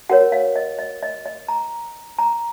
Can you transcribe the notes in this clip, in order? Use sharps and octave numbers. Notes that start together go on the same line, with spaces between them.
F#4 A#4 C#5 F#5
F5
D#5
D#5
D#5
D#5
A#5
A#5